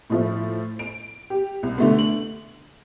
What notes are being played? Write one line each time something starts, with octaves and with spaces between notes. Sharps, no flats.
A2 F3 A3
D7
G4
C2
D3 A3 B3
F#7